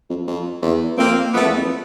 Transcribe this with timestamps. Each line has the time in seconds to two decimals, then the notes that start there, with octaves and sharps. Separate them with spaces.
0.10 F2
0.28 F2
0.62 E2
0.97 F2 A#3 C4
1.33 F2 A3 B3
1.45 E2
1.57 F2